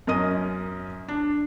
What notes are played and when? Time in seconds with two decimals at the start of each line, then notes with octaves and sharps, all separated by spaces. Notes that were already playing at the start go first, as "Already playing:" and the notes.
0.07 F#2 C#4 A#4 D#5 D#6 D#7
1.09 D4